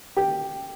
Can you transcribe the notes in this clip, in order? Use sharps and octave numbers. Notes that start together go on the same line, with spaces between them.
G4